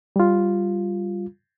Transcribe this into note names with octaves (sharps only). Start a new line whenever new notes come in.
G3 F4